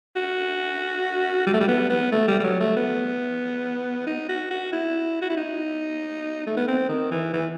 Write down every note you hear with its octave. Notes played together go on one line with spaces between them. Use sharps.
F#4
G3
A3
G3
B3
B3
A3
G3
G3
F#3
A3
B3
D#4
F#4
F#4
E4
F#4
E4
D#4
A3
B3
C4
D#3
E3
E3